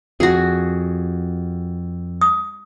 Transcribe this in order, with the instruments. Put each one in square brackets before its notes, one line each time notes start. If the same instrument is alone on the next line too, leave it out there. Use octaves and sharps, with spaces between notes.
[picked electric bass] F2 [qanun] F#4 G#4
[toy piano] D#6